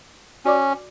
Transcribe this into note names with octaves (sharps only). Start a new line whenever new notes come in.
C#4 F#4 D5 D6